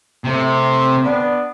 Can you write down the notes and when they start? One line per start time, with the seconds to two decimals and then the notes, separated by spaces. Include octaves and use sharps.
0.25 C3 A3 C4
1.02 B3 D4